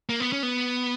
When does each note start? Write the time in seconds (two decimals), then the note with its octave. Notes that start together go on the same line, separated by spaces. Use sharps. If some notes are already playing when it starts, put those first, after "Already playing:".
0.09 A#3
0.20 B3
0.32 C#4
0.43 B3